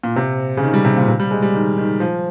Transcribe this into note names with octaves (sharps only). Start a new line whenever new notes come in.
A#2
C3
C#3
D#3
G3
C3
A#2
C3
G3
G#3
G3
D#3
D#3
F3